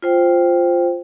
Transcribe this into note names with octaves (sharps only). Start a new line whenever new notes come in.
F4 C5 G5